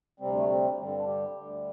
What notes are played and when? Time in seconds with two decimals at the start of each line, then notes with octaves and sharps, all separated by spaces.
0.20 D2 C3 G3 C4
0.35 A3
0.49 C4
0.78 G2 D3 G3 C4
0.88 C4
0.98 D4
1.07 G4
1.37 D2 D3 G3